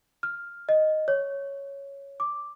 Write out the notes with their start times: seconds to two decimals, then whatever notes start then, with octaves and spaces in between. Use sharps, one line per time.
0.23 F6
0.69 D#5
1.08 C#5
2.20 D6